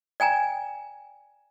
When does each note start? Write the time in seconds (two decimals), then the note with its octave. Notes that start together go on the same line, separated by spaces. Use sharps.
0.20 D5 G5 G#5 A#5